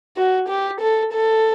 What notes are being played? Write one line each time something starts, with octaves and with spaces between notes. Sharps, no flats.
F#4
G4
A4
A4